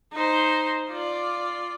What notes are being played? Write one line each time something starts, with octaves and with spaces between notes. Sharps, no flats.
D#4 C5
F4 D5